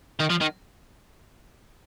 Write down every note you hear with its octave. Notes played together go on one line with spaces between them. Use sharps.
D#3
F3
D#3